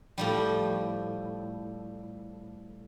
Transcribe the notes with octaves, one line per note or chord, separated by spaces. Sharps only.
A2 F3 G3